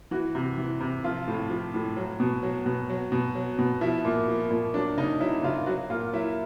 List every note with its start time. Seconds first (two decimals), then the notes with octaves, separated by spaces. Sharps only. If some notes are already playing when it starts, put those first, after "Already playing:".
0.11 E3 F#4
0.35 C3
0.58 E3
0.80 C3
1.04 F3 F4
1.28 A2
1.50 F3
1.74 A2
1.97 F#3
2.20 B2
2.43 F#3
2.66 B2
2.89 F#3
3.12 B2
3.35 F#3
3.59 B2
3.81 F3 E4
4.05 A#2
4.28 F3
4.51 A#2
4.74 F#3 D4
4.97 C#3 D#4
5.20 F#3 E4
5.43 C#3 F4
5.66 F#3 F#4
5.90 A#2 F4
6.13 F#3 E4